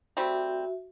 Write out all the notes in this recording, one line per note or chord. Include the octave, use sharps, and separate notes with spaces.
G3 A3 C4 F#4 E5